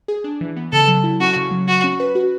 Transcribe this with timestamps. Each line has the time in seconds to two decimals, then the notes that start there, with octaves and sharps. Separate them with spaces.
0.08 G#4
0.24 D4
0.41 E3
0.57 B3
0.72 C#3 A4
0.88 F#3
1.04 E4
1.20 C#4 F#4
1.36 C#3
1.51 F#3
1.67 F#3 F#4
1.84 C#4
2.00 B4
2.15 F#4